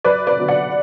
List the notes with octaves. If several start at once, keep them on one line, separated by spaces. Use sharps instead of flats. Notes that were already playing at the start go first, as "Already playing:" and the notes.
F#2 B4 D5
B4 D5
D3 F#3 B3
D5 F#5